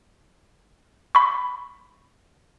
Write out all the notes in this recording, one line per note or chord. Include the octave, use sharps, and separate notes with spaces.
B5 C#6